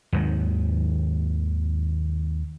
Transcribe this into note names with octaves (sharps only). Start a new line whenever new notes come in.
D#2 G#2 D#3 F#3